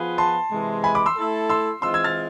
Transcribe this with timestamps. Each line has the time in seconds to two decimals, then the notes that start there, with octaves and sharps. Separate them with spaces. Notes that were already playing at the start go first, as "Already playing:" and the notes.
Already playing: F3 B3 F4 G#4 B4
0.18 A5 C6
0.51 C3 E3 G#3
0.84 G#5 B5
0.95 B5 D6
1.06 C6 E6
1.17 A3 E4 A4
1.49 C6 E6
1.82 E3 G#3 C4 F4 C6 E6
1.94 E6 G#6
2.04 F6 A6